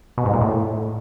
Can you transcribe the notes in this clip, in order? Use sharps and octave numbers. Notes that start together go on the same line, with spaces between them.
B2
G#2
A#2
A2